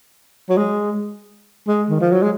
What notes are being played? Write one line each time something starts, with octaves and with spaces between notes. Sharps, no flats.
F#3
G#3
G#3
D#3
F3
F#3
G#3